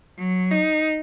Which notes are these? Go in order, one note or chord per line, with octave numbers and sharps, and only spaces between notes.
F#3
D#4